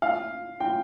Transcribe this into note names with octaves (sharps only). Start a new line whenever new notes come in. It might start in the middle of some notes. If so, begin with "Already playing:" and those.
F5
G5